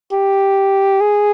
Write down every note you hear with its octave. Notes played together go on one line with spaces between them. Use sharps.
G4
G#4